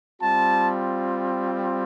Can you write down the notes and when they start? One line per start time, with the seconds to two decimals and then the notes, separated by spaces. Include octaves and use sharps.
0.22 G3 C4 F4 A5